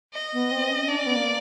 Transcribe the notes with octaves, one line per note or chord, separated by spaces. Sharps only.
D#5
B3
C4
C#4
D4 D5
C#4
B3
A#3